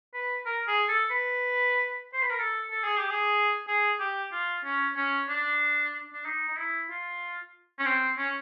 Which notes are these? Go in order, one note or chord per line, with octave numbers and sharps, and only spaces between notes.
B4
A#4
G#4
A4
B4
C5
B4
A#4
A4
A4
G#4
G4
G#4
G#4
G4
F4
C#4
C#4
D4
D4
D#4
D#4
E4
F4
C#4
C4
C#4